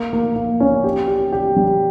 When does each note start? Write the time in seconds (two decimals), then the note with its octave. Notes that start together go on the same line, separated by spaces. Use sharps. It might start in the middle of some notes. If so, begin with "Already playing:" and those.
Already playing: A#3
0.13 A#3
0.36 A#3
0.60 C#4
0.84 G4
1.08 G4
1.32 G4
1.56 G3